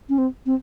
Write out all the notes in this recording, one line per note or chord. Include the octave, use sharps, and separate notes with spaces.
C#4
C4
C4